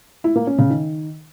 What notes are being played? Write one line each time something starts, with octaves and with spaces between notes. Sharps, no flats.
E4
A#3
C#4
C#3
D#3